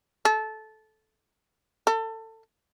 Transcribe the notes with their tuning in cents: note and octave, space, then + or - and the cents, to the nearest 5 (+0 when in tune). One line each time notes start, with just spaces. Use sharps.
A4 -15
A4 +25